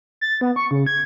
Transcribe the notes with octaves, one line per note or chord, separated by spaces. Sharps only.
A6
B3
C#6
C#3
G#6